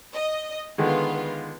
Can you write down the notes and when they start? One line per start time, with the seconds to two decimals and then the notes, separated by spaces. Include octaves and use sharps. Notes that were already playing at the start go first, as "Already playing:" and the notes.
0.14 D#5
0.78 D3 D#3 G#3 B3 F4